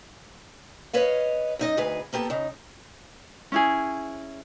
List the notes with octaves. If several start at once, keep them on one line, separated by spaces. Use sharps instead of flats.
B4 C#5 D#5 F5
F#2 D#4 D#5
D2 D#4 G#4 B4
A#3 B3 G4 A4
C#3 D#4
C#4 E4 G#4